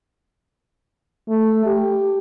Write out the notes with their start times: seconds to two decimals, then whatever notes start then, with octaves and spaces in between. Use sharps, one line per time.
1.29 A3
1.66 G4